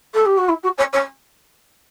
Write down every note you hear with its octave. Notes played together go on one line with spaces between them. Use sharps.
A4
G4
F#4
E4
F#4
C#5
C#5